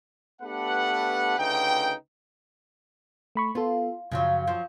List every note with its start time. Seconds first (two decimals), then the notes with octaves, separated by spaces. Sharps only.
0.42 A3 B3 D4 G4 B4 F#5
1.38 D2 C#3 D#4 B4 G5
3.35 A3 B5 C#6
3.55 B3 F4 A4
4.12 F#2 C#3 F3 F#3
4.47 F3 F#3